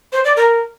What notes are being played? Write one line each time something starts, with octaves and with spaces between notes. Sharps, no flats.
C5
D5
A#4